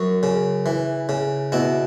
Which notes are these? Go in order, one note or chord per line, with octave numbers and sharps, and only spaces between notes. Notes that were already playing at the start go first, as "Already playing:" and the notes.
Already playing: F#2 C#5
C#3
E3
C#3
B2 E4